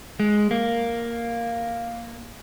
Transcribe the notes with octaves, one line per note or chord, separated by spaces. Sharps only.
G#3
A#3